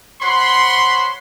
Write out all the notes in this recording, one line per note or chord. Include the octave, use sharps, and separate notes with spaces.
C5 C#5 F#5 B5 C6